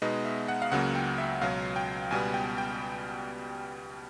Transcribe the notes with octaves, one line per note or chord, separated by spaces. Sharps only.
B2 G#3 B3 D#4 D#5
E5
F#5
F5
C#2 C#3 F#3 A#3 F#5
G5
E5
C#2 B2 F#3 F5
G5
C#2 B2 G3 B3 G#5
G5
G5